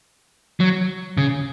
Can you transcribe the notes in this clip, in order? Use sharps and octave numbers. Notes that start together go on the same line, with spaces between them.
F#3
C#3